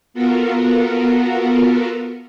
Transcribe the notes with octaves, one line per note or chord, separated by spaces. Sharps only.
B3 F4 F#4 A4 A#4